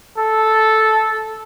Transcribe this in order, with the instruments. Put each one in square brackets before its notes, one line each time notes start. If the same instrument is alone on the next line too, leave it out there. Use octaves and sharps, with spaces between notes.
[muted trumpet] A4